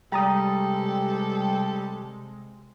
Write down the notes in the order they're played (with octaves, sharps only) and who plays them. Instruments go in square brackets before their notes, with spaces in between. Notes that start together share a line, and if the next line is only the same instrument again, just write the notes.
[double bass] C3 G#3 [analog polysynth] G3 [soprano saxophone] A4 [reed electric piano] G5 A#5 D#6